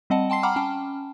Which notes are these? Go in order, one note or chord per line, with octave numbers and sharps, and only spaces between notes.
G3 C4 D#5 F#5 A5
G5 A5 C6 C7
F#5 G5 A#5 B5 D6 F6
C#4 G5 A5